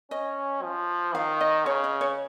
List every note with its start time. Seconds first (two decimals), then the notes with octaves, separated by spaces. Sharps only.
0.11 C#4 D#5
0.63 F3
1.15 D#3 F5
1.41 D#5
1.66 C#3 C#5
1.84 D#5
2.01 C#5